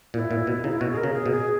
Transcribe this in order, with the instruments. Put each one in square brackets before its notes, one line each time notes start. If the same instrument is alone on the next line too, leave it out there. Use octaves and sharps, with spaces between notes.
[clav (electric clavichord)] A#2 [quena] E4
[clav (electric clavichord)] A#2
B2
[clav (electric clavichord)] C#3 [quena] D#4
[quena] E4
[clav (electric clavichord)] B2 [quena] F#4
[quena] G#4
A#4
[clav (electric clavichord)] C#3
[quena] G#4
[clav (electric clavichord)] B2
[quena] G#4